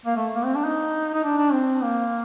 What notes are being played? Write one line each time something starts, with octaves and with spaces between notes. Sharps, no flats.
A#3
A3
A#3
C4
D4
D#4
D#4
D4
D4
C4
A#3